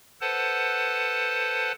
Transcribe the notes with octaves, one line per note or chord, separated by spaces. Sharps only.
A4 B4 C5 F#5 A5